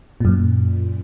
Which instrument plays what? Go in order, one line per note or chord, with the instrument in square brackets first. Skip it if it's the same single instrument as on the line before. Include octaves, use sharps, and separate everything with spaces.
[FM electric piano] F#2 A#2